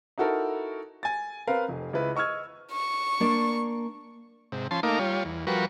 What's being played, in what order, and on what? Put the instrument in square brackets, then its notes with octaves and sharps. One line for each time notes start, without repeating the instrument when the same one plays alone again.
[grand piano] D#4 E4 F#4 A4 A#4
G#5 A6
C4 A#4 B4 F5
F1
C#2 E4 B4
D#5 C#6 E6 F6 G#6
[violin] C#6
[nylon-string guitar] A#3 D4 D5
[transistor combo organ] G#2 C3
F3 C#4 A5 C6
A3 A#3 D#4 A#4 F5 D6
G3 F4 C#5
E2
F3 G3 F#4 A#4 B4 C#6